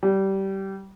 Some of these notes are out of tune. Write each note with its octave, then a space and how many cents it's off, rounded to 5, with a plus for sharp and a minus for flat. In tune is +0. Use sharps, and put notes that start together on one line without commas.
G3 -20